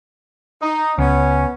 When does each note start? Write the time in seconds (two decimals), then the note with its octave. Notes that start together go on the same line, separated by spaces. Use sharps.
0.62 D#4
0.98 C#2 B3 C#4